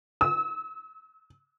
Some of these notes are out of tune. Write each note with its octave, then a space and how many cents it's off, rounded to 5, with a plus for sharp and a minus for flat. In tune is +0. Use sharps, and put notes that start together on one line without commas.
E6 -45